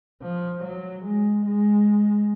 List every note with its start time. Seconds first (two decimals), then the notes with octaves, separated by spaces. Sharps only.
0.22 F3
0.63 F#3
1.04 G#3
1.46 G#3